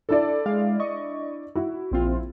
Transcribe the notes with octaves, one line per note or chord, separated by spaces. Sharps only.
D4 E4 A4 D5
G#3 F5
D#5 C#6
E4 F#4
A#1 C4 F4